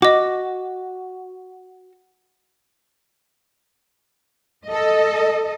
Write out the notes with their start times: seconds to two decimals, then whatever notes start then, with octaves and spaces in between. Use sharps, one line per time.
0.02 F#4 D#5 D6
4.66 A4 D#5